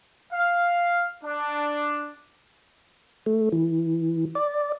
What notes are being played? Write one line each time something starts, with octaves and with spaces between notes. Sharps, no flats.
F5
D4
A3
E3
D5